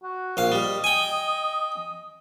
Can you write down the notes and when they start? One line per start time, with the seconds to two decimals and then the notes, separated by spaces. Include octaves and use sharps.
0.03 F#4
0.37 A#1 F5
0.52 G3 D#5
0.84 G5 G#5